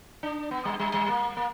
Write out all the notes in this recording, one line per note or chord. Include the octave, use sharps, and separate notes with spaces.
D4
B3
G3
G3
G3
A#3
A#3